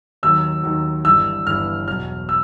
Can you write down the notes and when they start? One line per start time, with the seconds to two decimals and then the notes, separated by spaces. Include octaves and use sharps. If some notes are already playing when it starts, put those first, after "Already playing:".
0.23 D#2 D#3 F#3 E6
0.63 D#2 D#3 F#3
1.04 G1 G2 E3 E6
1.46 G1 G2 E3 F6
1.88 E2 B2 F#3 F6
2.29 E6